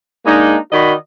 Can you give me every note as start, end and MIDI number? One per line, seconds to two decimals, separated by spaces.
0.25 0.57 56
0.25 0.57 58
0.25 0.57 62
0.25 0.57 63
0.72 0.93 51
0.72 0.93 66
0.72 0.93 74
0.72 0.93 75
0.72 0.93 83